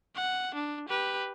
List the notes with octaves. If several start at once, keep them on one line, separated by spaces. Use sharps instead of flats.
F#5
D4
G4 B4